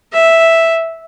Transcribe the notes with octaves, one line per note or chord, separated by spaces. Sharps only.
E5